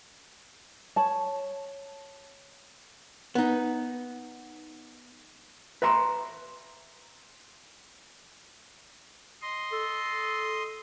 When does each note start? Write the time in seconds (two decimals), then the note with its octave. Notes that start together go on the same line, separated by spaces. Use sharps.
0.96 C#5 A5
3.35 B3 D#4
5.82 B4 E5 A#5 C6
9.42 D#5 C6
9.72 A4